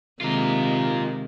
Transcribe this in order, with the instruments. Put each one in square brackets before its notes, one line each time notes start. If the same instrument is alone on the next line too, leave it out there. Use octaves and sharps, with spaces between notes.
[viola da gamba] C3 D#3 G#3 [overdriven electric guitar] F4 A#4